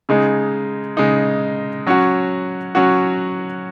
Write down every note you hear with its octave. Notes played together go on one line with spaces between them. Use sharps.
C#3 G#3 D#4
C#3 G#3 D#4
F#3 C#4 F#4
F#3 C#4 F#4